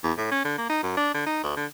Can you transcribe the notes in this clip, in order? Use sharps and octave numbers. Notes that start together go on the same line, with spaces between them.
E2
A2
C#4
D3
A#3
D#4
F#2
D4
D3
D#4
D2
D3